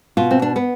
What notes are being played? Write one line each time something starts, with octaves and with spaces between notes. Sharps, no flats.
B2 F4
C4
D4
B3